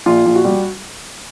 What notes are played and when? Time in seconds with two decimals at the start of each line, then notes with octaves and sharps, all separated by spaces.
0.06 A#1 F4
0.26 A#1
0.35 F#4
0.45 G3